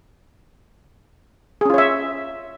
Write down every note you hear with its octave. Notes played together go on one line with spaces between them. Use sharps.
C#4 F4 G#4 C#5 E5